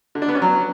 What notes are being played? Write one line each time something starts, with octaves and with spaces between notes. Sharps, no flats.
D3
D4
B3
C#4
F#3